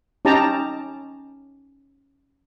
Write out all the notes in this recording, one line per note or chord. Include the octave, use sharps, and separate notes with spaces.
C#4 D#4 G4 A5 A#5